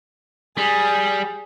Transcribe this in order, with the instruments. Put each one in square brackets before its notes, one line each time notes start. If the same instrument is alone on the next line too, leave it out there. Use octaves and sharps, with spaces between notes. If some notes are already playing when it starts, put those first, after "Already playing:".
[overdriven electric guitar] G3 [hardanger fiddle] G#4